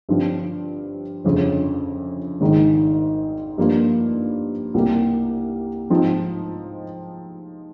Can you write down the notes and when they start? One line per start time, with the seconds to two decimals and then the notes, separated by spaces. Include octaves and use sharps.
0.09 G1 G2 F3 C4 F4
1.25 G1 F2 C#3
2.41 G#1 G#2 D#3 G#3
3.58 G2 F3 A#3 F4
4.74 C2 C3 G3 A#3
5.90 G#2 F3 C4 D#4